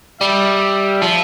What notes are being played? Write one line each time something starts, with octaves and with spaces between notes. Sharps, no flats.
G3 E5
F3